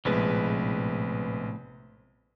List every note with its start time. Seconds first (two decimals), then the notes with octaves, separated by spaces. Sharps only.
0.05 A#1 A2 C3 G#3 B3 B4